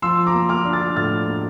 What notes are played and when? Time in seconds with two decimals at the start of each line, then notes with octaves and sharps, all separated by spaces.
0.02 F3 C6 E6
0.27 A#5 D6
0.34 A#3
0.49 D6 F6
0.65 D4
0.73 F6 A6
0.96 A2 F6 A6
1.28 A#3